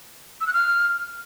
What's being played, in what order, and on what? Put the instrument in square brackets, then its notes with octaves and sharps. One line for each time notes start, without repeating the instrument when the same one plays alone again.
[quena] E6
F#6
F6